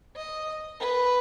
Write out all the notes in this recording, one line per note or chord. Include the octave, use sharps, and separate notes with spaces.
D#5
B4